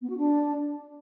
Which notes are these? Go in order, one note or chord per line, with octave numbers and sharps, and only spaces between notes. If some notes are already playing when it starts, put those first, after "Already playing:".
B3
F#4
D4